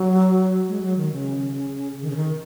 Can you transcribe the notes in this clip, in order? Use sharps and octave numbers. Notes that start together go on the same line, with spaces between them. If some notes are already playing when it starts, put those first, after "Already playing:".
Already playing: F#3
G#3
F#3
D#3
C#3
D#3
C#3
D#3